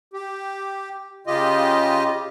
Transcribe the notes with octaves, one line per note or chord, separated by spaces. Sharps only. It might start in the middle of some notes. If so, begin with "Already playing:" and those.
G4
C#3 F4 G4 D#5